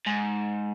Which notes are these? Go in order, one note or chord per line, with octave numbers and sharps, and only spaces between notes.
G#2